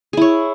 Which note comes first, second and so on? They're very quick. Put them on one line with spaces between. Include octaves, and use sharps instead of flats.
G#4 E4 C#5